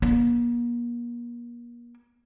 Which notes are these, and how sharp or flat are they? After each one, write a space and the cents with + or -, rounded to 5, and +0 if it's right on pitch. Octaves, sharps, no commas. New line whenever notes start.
A#3 +40